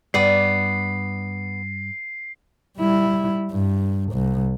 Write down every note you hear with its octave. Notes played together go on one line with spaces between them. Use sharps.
G2 B3 D5 C7
G3 E4
G2
C2